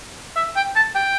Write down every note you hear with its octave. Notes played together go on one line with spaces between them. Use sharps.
E5
G5
A5
G5